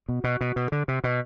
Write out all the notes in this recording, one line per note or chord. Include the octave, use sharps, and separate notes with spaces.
B2
B2
B2
B2
D3
C3
B2